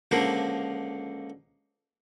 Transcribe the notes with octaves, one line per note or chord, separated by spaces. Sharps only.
C#2 D3 F3 A#3 A#4